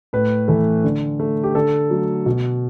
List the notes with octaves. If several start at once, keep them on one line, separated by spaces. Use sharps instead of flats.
A2 B4
E3 A3
D3
A3
G4
D3 A4
F#3 A3
B2